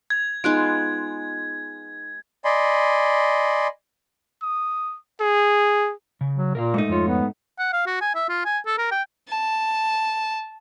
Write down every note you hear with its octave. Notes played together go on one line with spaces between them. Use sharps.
G#6
G#3 B3 D#4 F4 F#6 D7
D5 D#5 G#5 B5 C6
D#6
G#4
C#3
F#3
A#2 A#4 E5 F5
G#2 A3 D#4
F2 F4 C#5
B3
F#5
F5
F#4
G#5
E5
F4
G#5
A4
A#4
G5
A5